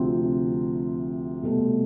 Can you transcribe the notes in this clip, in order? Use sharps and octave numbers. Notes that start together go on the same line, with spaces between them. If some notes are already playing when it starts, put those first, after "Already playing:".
Already playing: D2 C3 F3 C4
C2 B2 A3